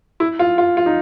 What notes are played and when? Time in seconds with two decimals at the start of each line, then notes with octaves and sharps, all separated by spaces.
0.20 E4
0.39 F4
0.58 F4
0.77 F4
0.86 D#4